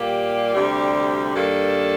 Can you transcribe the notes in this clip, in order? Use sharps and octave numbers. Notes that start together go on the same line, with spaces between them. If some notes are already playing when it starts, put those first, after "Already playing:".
Already playing: A#2 G3 A#3 G4
D2 C3 G3
G2 D#3 G3 A#3 A4